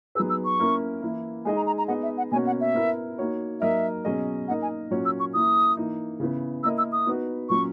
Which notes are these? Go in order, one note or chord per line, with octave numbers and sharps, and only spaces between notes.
F#3 B3 D#4 G#4 B4 E6
E6
C#6
A#3 C#4 E4 A#4
E3 A#3 E4
G#3 D#4 G#4 D#5 G#5
A#5
A#5
A#5
B3 D#4 G#4 D#5 F#5
E5
F#5
B2 A#3 C#4 F#4 C#5 G#5
F#5
E5
B3 E4 A#4
A#3 D#4 F#4 C#5
F#3 A#3 D#4 A#4 D#5 E5
B2 F#3 C#4 G#4 D#5
A#3 D#4 A#4 D#5 F#5
G#5
A#2 F#3 C#4 F#4 C#5
E6
C#6
E3 A#3 E4 D#6
E3 A#3 D#4
C#3 E3 B3
A#3 E4 A#4 D#5 E6
E6
D#6
B3 D#4 F#4 B4
A#2 F#3 C#4 C#6